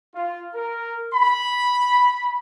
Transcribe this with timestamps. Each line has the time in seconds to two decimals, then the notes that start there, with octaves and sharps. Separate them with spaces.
0.15 F4
0.54 A#4
1.14 B5